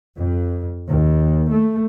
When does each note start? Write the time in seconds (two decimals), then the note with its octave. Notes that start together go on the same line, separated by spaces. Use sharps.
0.18 F2
0.88 D#2
1.50 A3